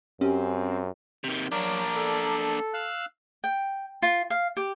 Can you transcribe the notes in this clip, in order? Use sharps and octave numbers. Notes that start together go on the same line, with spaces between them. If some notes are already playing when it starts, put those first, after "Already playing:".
F#2 C4 C#4 G4
C3 D#3
F#3 A#3 D4 A#4 D5
A4
F5 E6 F#6
G5
F4
F5
G4